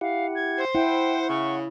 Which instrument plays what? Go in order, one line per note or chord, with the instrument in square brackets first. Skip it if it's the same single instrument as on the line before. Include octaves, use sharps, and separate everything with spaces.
[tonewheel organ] E4 G4 F#5 [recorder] F5
[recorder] G#6
[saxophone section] C5
[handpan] E4 [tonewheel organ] F#5 [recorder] G5
[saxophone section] C#3 [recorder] C#6